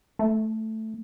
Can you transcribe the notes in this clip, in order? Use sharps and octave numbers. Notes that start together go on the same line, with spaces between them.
A3